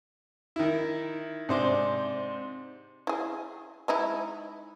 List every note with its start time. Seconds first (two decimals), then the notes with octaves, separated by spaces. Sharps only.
0.56 D#3 E4
1.49 G#2 C3 D4 C5 C6 D6
3.07 E4 G#4
3.88 G#3 D#4 E4